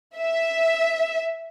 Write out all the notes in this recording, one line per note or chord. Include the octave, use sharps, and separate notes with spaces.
E5